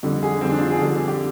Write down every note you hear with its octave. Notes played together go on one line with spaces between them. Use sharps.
F2 D3 G3
G#4
F2 D3 G3 C4
D4
F4
G#4
F2 D3 G3
G4